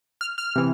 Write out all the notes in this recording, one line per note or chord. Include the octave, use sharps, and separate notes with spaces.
F6
F6
C3 E3